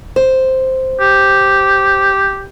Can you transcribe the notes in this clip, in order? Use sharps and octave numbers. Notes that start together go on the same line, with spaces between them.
C5
G4